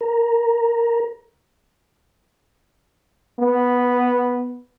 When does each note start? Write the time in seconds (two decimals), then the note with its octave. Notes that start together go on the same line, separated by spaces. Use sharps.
0.01 A#4
3.40 B3